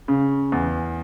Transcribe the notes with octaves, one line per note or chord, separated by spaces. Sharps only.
C#3
E2